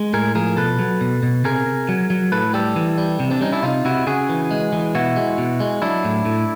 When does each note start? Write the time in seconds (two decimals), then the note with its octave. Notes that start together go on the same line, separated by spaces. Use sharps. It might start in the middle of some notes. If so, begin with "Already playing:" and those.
Already playing: G#3
0.13 A2 G#4 A#4
0.35 F3 G#4 A#4
0.57 B2 A4 B4
0.79 F#3
1.01 B2
1.23 B2
1.44 C3 G#4 A#4
1.66 C3
1.89 F#3
2.10 F#3
2.32 A2 A4 B4
2.54 G3 G4 A4
2.76 E3
2.98 G3
3.20 C3
3.30 C4 D4
3.41 G3 C#4 D#4
3.52 D4 E4
3.63 C3 D#4 F4
3.85 C3 E4 F#4
4.07 C#3 F#4 G#4
4.29 E3
4.51 G#3
4.73 E3
4.95 B2 E4 F#4
5.16 G#3
5.38 B2
5.60 G#3
5.82 F#3 D4 E4
6.04 A2
6.25 A2